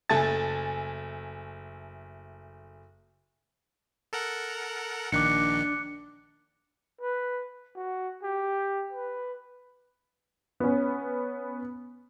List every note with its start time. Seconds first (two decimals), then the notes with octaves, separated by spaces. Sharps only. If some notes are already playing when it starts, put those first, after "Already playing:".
0.09 F#1 A3 A4 G#5 A5 A6
4.13 A4 A#4 F#5
5.12 A#1 D#3 D4 D6 F#6 C#7
7.01 B4
7.76 F#4
8.23 G4
8.92 B4
10.60 B3 C#4